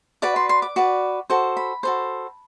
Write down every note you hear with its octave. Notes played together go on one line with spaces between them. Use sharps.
F#4 B4 D5 D6
C6
C6
D6
F#4 B4 D5
F#4 A4 C5
B5
F#4 A4 C5